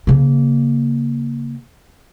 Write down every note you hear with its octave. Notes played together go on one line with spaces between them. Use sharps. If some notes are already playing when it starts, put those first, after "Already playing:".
C#3 A#3